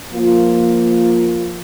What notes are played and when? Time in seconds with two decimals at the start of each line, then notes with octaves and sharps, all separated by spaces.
0.10 F3 A#3 F4